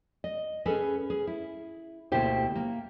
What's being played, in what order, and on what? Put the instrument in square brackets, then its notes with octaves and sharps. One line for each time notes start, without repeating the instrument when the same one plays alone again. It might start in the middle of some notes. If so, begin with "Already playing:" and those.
[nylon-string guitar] D#5
C#4 G#4 A4 B4
G#4
E4
D2 B2 A#3 E4 G4 C5
A#3